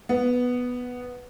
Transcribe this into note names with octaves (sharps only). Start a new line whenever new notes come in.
B3